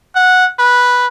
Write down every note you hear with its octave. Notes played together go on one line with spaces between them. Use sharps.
F#5
B4